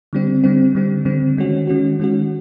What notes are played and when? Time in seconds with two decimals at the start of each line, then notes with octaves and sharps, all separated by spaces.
0.13 D3 G3 C4
0.44 D3 G3 C4
0.75 D3 G3 C4
1.05 D3 G3 C4
1.37 D#3 G#3 C#4 F#4
1.67 D#3 G#3 C#4 F#4
2.00 D#3 G#3 C#4 F#4